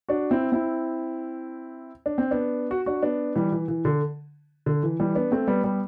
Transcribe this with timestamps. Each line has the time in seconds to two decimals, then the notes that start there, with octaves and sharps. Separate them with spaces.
0.09 D4 F#4
0.31 C4 E4
0.52 C4 E4
2.06 D4
2.18 C4
2.31 B3 D4
2.71 F#4
2.86 D4 F#4
3.03 B3 D4
3.36 E3 G3
3.52 E3
3.68 E3
3.85 D3
4.66 D3
4.83 E3
5.00 E3 G3
5.15 B3 D4
5.32 A3 C4
5.48 G3 B3
5.64 G3 B3